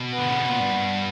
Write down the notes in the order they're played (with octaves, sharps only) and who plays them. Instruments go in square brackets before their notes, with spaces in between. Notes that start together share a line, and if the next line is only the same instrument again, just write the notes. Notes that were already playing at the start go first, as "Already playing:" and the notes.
Already playing: [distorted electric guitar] B2
[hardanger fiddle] B3
[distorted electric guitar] D3
C#3
B2
A#2
G2